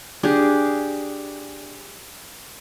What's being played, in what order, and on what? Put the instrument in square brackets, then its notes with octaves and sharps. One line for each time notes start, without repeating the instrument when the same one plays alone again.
[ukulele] D4 [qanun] G4 G#4